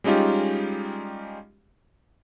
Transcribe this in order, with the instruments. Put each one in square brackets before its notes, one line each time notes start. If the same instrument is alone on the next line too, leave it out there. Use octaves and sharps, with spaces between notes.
[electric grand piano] G3 G#3 C#4 D#4 F4 G4